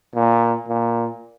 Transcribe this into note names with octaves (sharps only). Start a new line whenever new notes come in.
A#2
A#2